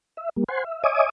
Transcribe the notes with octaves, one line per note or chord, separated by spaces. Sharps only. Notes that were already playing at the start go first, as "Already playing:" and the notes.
E5
G3 A#3
C5 F#5 G#5 C6
E5
C#5 D#5 E5 G#5 D6 D#6